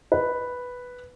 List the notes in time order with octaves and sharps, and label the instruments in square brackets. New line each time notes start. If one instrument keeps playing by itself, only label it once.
[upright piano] B4